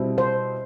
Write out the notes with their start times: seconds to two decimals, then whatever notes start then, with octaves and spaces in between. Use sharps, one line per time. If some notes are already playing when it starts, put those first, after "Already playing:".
Already playing: B2 G3 C4 E4
0.18 C5